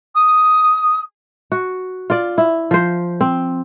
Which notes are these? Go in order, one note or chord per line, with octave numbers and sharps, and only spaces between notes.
D#6
F#4
F4 D5
E4
F3 C5
C4